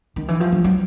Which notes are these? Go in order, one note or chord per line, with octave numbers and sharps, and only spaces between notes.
D#3
E3
F3
F#3
F#3